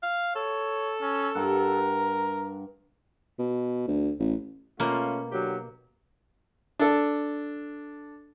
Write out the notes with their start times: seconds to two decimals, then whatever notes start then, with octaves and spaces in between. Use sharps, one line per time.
0.03 F5
0.35 A4 C#5
1.01 C#4
1.35 G2 A#4 F#5
3.39 B2
3.87 D2
4.19 A1
4.80 B2 A3 A#3 C#4 F4
5.31 D3 F#3 G4
6.79 D4 A4